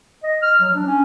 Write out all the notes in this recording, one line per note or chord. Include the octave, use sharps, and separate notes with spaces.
D#5
F6
F#3
D4
C#4